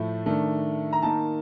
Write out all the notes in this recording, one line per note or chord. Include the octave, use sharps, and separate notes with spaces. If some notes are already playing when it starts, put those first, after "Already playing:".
Already playing: A2 F3 A3
D#3 A3 D4
A#5
D#3 A#3 D#4 A5